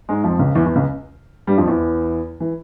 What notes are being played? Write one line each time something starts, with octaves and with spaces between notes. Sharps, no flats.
G#2 G#3
F2 F3
C#2 C#3
E2 E3
E2 E3
C#2 C#3
G2 G3
F2 F3
E2 E3
E3